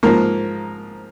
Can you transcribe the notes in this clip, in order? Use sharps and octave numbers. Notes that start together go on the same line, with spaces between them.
G#2 F3 A#3 A#4